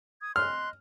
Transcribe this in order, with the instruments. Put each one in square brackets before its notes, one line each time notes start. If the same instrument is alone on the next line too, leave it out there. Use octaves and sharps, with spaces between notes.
[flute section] D#6 G#6
[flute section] D#5 C6 F#6 [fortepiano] F6